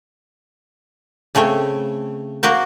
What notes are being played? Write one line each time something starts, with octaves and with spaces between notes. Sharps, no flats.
C#3 A3 C4 C#5
A#3 F#4 A#4 C5